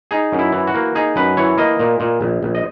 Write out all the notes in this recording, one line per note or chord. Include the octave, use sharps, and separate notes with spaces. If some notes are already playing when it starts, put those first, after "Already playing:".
D#4 G#4
F#2
E4
E3
F#4
A#3
D#4 G#4
F#2 B4
E3 C#5
A#3 D#5
A#2
A#2
A#1
A#1
D#5